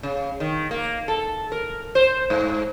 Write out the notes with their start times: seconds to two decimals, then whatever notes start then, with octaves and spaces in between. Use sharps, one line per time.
0.03 C#3
0.40 D#3
0.71 A#3
1.08 A4
1.52 A#4
1.95 C5
2.30 G#2